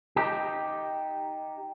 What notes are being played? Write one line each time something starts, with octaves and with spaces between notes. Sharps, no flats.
D#4 G4